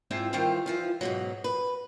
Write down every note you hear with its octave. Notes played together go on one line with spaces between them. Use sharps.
G#2 C4 E4 F4 G5
D#3 E3 G3 C4 F4 C5
E3 F3 F4
G#2 B2 F#3
B4